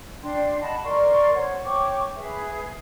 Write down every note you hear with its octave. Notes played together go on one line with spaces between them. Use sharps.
D4 G5 C6
D#5 F#5 A5 B5
A#4 D5 C6 C#6
C5 C#5 F#5
C#5 G5 C#6 D6
G#4 B4 E5